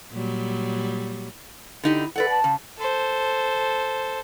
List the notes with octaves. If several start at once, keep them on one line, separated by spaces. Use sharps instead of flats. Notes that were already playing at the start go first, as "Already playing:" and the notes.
A#2 F#3 G3
D3 D#4 E4 G4
A4 B4 D5 F#5
A5
C#3
A4 C5